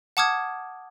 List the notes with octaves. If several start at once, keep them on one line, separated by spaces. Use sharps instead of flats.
F#5 A5 D6 D#6 F6 G#6